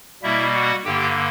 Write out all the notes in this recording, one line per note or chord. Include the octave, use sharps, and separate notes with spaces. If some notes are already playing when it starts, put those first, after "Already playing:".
B2 G3 A#3 E4 E5
F#4 F#5
G2 D3 A#3 G4 G5